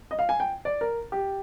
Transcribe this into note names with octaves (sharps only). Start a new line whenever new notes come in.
D#5
F5
G#5
G5
D5
A#4
G4